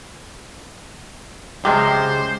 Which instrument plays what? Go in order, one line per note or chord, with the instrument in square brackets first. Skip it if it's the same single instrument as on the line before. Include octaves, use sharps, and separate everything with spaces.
[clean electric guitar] C#2 G#3 G4 [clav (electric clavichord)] C3 F3 F#3 [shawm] C5